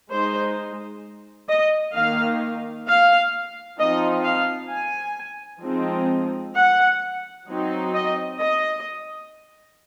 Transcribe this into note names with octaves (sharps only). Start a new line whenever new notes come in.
G#3 D#4 C5
D#5
D#3 A#3 D#4 F5
F5
F3 C4 D#4 D#5
F5
G#5
F3 G#3 C4 D#4
F#5
F#3 C4 D#4
D#5
D#5